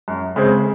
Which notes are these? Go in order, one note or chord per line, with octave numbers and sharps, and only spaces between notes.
F#2
C#3 G#3 C4